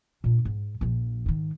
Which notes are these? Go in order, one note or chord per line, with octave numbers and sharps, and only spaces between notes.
A#2 D4
G#2
A#1 F3
G#2 D#3